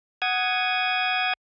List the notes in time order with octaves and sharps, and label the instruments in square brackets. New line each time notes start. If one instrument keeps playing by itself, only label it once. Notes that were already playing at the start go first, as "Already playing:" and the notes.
[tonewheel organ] F#5 D#6 G#6